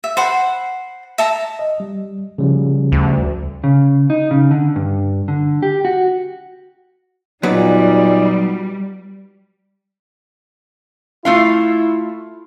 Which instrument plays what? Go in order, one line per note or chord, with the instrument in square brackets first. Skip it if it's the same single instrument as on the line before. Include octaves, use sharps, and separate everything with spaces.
[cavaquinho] E5
C5 F#5 B5
E5 A5 A#5
[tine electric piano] D#5
G3
C#3 F3 G3
[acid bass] D2
[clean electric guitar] C#3
D#4
C#3
D3
G2
D3
G4
F#4
[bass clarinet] A#2 [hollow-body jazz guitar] F#3 B3 [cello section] G3 [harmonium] D#4 D5
[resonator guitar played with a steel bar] A3 F4 F5 [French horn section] E4